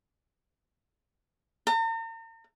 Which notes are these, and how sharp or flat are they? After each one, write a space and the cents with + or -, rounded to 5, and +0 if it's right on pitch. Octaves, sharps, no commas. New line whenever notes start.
A#5 -45